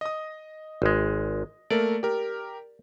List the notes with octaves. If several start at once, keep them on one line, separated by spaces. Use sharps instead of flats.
D#5 D#6
G#1 G#3
A3 A#3 A#4 D5
G4 A#4